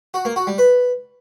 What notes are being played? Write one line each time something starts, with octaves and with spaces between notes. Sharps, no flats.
F#4
A#3
F#4
G3
B4